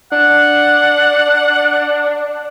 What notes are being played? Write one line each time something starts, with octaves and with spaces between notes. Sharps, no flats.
D4 F#5